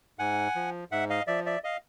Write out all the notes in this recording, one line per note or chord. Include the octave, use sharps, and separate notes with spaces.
G#2 F#5 G#5
F3
G#2 E5 F#5
D#5 F5
F3 D5 E5
D5 E5
D#5 F5